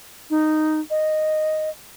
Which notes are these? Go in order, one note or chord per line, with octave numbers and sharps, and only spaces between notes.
D#4
D#5